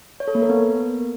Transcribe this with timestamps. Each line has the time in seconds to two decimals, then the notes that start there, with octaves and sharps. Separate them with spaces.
0.20 C#5
0.28 A4
0.35 A#3
0.42 A#4
0.49 B3